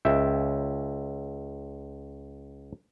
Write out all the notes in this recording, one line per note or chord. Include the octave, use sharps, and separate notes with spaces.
C#2 E5 G5